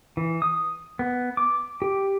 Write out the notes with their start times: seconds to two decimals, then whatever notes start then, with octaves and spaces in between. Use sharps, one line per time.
0.17 E3
0.42 D#6
0.99 B3
1.37 D6
1.82 G4